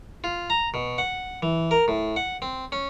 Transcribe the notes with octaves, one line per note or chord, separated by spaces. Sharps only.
F4
A#5
B2
F#5
E3
A#4
A2
F#5
C4
C#4